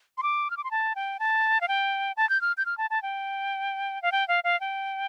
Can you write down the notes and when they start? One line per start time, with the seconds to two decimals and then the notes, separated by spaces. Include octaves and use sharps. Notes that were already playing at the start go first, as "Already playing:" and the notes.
0.18 C6
0.23 D6
0.50 F6
0.57 D6
0.64 C6
0.71 A5
0.96 G5
1.19 A5
1.61 F5
1.68 G5
2.17 A5
2.30 G6
2.41 F6
2.57 G6
2.66 F6
2.78 A5
2.90 A5
3.03 G5
4.02 F5
4.12 G5
4.28 F5
4.44 F5
4.60 G5